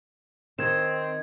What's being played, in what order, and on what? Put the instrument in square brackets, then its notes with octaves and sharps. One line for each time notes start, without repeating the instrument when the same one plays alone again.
[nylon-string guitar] D#3 [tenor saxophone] C4 [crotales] G#6 E7